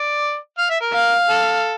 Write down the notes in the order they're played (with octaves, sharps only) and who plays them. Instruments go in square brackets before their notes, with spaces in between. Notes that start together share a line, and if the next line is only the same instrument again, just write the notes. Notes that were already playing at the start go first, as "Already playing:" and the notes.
Already playing: [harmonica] D5
F5
E5
A#4
[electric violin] F5
[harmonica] A4